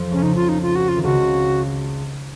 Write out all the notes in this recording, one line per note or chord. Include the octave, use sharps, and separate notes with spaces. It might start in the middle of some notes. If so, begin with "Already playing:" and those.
Already playing: F2 F3
C#2 C#3 C#4
C#2 C#3 D#4
F4
D#4
F4
F#4
F4
D#3
C#2 C#3 F#4